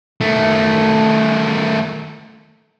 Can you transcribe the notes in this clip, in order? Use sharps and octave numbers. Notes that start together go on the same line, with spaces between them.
D#3 A3